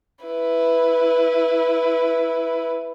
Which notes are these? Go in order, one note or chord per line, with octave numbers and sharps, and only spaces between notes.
E4 B4